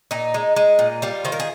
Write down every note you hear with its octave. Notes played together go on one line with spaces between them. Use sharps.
A#2 D#4
G#3
G#3
A#2
G3 F4
D#3 C5
A#4
G#4